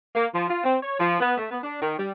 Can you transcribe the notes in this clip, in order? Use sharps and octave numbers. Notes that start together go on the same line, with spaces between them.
A#3
F3
F4
C4
C#5
F3
B3
A3
B3
D4
D#3
G3